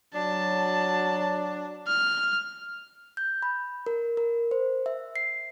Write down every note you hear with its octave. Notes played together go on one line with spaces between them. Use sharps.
F#3 D4 A5
F6
G6
B5
A#4
A#4
C5
E5
C7